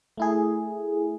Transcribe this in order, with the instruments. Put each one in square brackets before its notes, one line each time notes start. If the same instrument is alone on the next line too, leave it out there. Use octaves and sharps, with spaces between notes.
[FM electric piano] A3 E4 G#4